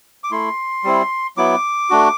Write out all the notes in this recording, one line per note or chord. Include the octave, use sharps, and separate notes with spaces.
D6
A3 E4 C6
G3 C4 E4
F#3 B3 E4 D6
A3 D4 F#4